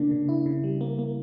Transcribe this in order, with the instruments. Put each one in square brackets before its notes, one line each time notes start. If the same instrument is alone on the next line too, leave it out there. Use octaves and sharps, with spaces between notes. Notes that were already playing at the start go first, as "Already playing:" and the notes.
Already playing: [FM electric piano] C#3 A#3 [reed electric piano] D4
[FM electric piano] C#3
E4
C#3
G3
A#3
A#3